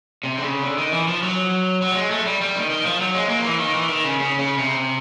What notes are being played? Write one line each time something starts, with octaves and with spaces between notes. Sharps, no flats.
C3
D3
C#3
D3
D#3
E3
F3
F#3
F#3
G3
G#3
A3
G3
G3
D#3
D#3
F3
F#3
G#3
A#3
F3
E3
D#3
E3
D#3
C#3
C#3
C#3
C3